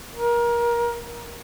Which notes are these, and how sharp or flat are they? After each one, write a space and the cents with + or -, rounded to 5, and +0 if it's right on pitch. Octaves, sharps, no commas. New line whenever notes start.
A#4 +25